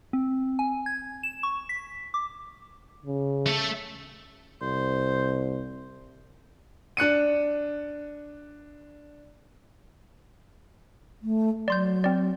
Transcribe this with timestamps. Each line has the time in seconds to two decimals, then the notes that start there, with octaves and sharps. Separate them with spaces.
0.13 C4
0.59 G#5
0.86 G#6
1.23 E7
1.43 C#6
1.69 B6
2.14 D6
3.06 C#3
3.46 A3 A4
4.62 C2 C5
6.97 D4 F#6 C#7 D#7
11.22 A3
11.68 F#3 D5 C6 G6
12.04 C4 D5